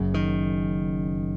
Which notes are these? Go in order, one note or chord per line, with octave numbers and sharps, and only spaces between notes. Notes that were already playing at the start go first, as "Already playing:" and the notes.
Already playing: F#1 F#2 C#3
D#3